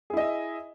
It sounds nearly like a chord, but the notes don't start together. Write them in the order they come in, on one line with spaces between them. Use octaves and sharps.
G#4 E4 D#5 E5